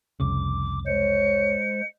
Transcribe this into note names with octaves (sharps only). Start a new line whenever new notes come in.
F1 C2 C#3 D6
G#3 C5 C#5 C#7